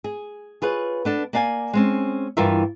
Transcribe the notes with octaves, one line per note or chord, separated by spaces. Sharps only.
G#4
F4 G#4 B4 C#5
B3 D4 A4
A#3 D5 F5 F#5 G#5
G#3 C4 C#4
G2 E3 F4 A#4 E5